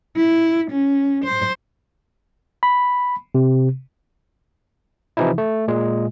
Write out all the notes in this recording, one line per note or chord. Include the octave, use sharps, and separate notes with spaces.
E4
C#4
C5
B5
C3
C3 E3 F3 D#4 E4
A3
A#2 G#3